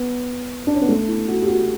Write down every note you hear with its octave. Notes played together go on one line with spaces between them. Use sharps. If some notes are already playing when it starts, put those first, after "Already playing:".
Already playing: B3
D4
C#4
B3
A3
E4
F#4
G4
F#4